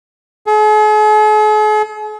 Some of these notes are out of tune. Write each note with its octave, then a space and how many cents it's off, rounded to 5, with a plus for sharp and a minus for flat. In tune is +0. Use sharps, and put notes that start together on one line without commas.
G#4 +45